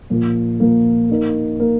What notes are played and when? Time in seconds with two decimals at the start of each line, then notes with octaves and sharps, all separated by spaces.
0.10 A#2 F3 A#3
0.60 A#2 F3 A#3
1.10 A#3 D#4 A#4
1.60 A#3 D#4 A#4